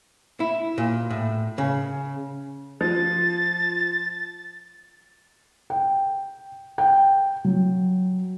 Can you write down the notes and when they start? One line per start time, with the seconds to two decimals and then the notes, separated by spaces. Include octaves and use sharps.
0.40 E4
0.78 A#2
1.10 A2
1.58 C#3
2.81 F3 A6
5.70 G5
6.78 G5
7.45 F#3